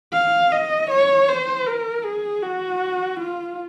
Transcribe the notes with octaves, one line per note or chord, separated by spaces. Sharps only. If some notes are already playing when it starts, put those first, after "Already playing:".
F5
D#5
C#5
C5
A#4
G#4
F#4
F4